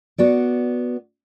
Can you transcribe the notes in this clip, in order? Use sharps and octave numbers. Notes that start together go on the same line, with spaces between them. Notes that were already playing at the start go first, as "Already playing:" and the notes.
B3 F#4 D5